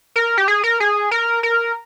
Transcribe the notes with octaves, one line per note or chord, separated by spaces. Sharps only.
A#4
G4
G#4
A#4
G#4
A#4
A#4